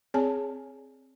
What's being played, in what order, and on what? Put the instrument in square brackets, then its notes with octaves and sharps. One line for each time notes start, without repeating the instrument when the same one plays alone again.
[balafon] C4 G#4 C#5 D5 G#5 A5